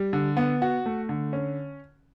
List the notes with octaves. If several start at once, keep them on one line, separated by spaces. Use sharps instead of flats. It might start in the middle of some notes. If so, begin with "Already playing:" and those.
Already playing: G3
D3
B3
F#4
A3
D3
C#4